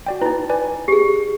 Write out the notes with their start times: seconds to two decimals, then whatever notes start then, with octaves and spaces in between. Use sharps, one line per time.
0.07 F#4 D5 G5
0.21 D#4 E4 B4
0.49 B4 D5 G#5
0.88 G4 G#4